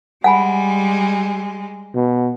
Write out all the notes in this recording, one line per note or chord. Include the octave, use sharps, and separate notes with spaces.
G3 G#3 F#5 G#5 B5
B2